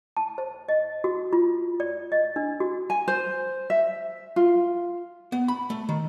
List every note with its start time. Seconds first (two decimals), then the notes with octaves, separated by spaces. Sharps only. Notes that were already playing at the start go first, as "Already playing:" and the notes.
0.17 A5
0.38 C5
0.69 D#5
1.04 F#4
1.33 F4
1.80 D5
2.12 D#5
2.36 D4
2.60 F#4
2.90 G#5
3.08 C5
3.70 E5
4.36 F4
5.32 B3
5.48 B5
5.70 A3
5.89 D#3